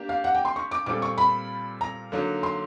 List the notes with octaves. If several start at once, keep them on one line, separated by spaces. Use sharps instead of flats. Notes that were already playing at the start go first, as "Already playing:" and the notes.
Already playing: A#3 D4 G4
F5
F#5
G5
C6
C#6
D6
A#2 G3 C4 F4 A4 D6
C#6
B5
A#5
D3 F#3 A#3 D#4
C6